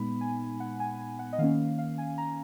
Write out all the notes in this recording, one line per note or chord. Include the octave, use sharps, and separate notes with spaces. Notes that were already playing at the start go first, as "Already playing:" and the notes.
Already playing: A#2 G#3 B3 D#4 B5
G#5
F#5
G#5
G#5
F#5
D#5
D#3 A#3 C#4 F5
F5
G#5
A#5